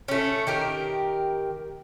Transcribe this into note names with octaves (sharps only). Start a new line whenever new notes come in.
A3 C#4
D#3 G4 A#4